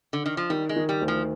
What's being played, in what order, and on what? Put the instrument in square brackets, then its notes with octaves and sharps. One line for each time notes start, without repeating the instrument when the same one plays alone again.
[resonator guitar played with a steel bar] D3
D#3
F3
[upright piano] D#3 [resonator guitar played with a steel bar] G3
[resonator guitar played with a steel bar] G#3
[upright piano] D#3
[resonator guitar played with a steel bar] G3
[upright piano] D2
[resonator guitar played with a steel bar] F3